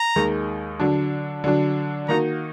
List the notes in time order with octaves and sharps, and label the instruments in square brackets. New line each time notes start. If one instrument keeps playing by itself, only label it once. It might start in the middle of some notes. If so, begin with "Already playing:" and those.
Already playing: [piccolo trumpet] A#5
[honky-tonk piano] D#2 D#3 G#3 D#4 G#4
D3 F#3 D4
D3 F#3 D4
[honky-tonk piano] D#3 A#3 D#4 F#4 [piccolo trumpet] A#5